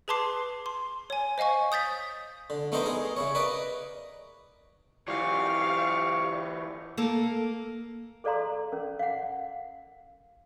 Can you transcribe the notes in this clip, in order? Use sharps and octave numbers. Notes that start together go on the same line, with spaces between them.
G#4 B4 A5 C6 D6 C7
C6
C#5 G#5
C5 D#5 F5 G#5 C#6
D#6 G6 A6 B6
D3
A3 B3 D#4 E4 A#4 C5
G#4 A#4
C#3 E4 C#5
A#4 B4 D5 D#5
E3 F#3 G4 D5 F5 C#6
A#3 A4
G#4 A4 D5 F5 A#5 C6
C#4 A#4
F5 F#5